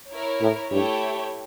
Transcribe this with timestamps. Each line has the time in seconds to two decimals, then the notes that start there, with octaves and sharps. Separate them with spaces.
0.11 E4 A#4 C#5
0.41 A2
0.71 G2 A3 E4 G4 C#5 G5